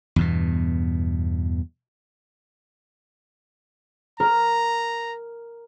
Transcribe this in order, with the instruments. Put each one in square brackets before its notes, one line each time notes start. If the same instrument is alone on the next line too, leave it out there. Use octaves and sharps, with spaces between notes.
[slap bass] E2 G2 B2
[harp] A#4 [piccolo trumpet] A#5